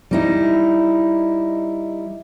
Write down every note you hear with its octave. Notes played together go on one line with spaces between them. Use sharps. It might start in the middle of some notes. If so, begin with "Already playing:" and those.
G3 D#4 E4